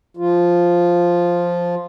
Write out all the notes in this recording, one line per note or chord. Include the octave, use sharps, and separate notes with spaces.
F3 F4